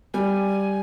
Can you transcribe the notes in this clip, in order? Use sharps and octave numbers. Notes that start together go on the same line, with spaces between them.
G3 G#5